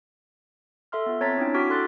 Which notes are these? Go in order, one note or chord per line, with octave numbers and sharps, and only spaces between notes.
A4 E5 C6 F6
B3 F4
C4 C#5 A5 A#5 A6 B6
C#4 D4 E4 G5
E4 F#4 D6 F6 B6 D7
E4 A4 C6 F#6 A6 D7